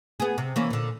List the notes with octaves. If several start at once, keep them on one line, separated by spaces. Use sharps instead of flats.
B3 G#4
C3
E3 A#3 C#4
A#2 D3